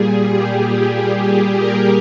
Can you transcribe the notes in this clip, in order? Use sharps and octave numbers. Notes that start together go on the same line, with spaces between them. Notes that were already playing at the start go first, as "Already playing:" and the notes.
Already playing: A#2 G3 G#4
G4
G#4
A#4